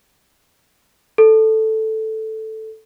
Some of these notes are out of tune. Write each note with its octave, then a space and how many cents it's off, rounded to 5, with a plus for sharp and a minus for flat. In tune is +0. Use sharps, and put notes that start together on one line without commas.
A4 +0